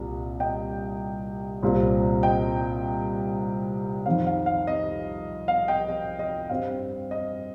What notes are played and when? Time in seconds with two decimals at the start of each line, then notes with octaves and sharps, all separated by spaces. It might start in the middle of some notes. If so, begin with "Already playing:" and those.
Already playing: C2 A#2 A#3
0.40 D#5 G5
1.63 C2 A#2 G3 C4
2.23 D#5 G5
4.05 F2 D#3 C4 F5
4.26 F5
4.46 F5
4.67 D#5
5.48 F5
5.68 D#5 G5
5.89 D#5
6.19 D#5
6.49 G2 G3 C4 F5
7.11 D#5